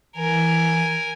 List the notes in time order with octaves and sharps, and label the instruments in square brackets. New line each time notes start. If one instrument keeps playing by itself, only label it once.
[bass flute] E3 [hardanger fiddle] A#4 G#5